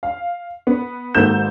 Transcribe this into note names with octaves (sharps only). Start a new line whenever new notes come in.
F5
B3
G#1 G#2 A#3 A4 G6 E7